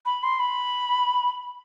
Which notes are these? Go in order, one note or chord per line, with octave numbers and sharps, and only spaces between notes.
B5
C6
B5